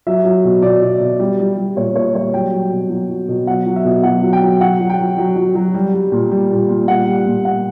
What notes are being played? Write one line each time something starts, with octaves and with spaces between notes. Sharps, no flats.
F#3 E5
F#3
B2
B2 D5
B2
B2
G3
G3
G3
A#2 C#5
A#2 C#5
G3 C#5
F#3 G5
F#3
B2
F#3
F#3
B2
F#3 F#5
F#3
E5
B2
F#3 F#5
F#3
G5
F#3
F#3 F#5
F#3
G5
F#3
F#3
F#3
F#3
G3
G3
A#2
G3
A#2
A#2
G3 F#5
G3
A#2
G3 F#5